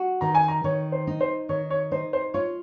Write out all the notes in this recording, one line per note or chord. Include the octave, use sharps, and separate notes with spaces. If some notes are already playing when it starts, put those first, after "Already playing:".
Already playing: F#4
D#3 A#5
G#5
A#5
D#3 C#5
C5
D#4
C5
D#3 C#5
C#5
D#4 C5
C5
F4 C#5